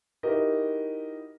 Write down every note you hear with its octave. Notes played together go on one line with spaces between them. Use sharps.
D#4 E4 F#4 G4 A#4 D#5